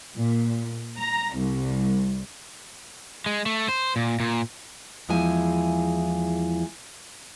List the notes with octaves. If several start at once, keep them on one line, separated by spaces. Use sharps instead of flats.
A#2
A#5
C2
G#3
A3
C5
A#2
A#2
E2 F3 G#3 E4 G#5